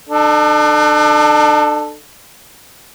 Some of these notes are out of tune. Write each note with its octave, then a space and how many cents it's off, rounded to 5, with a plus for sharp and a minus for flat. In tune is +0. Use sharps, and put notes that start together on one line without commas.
D4 +40 A4 +0